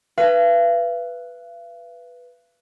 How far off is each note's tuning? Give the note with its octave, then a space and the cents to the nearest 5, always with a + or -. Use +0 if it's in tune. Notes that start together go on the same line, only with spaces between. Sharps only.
B4 +0 F5 -45